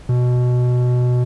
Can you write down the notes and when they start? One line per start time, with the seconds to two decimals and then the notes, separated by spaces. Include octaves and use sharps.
0.09 B2